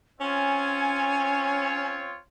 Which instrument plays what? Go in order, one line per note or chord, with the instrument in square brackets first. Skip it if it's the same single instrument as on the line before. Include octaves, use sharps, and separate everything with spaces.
[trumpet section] C4 F4 C#5 [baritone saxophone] C#4 [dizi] G#5